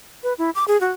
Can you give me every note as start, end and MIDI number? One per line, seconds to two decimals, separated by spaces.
0.23 0.33 71
0.38 0.50 64
0.55 0.64 86
0.68 0.80 68
0.81 0.91 66